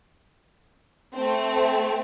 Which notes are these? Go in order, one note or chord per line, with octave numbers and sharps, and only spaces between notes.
A3 C4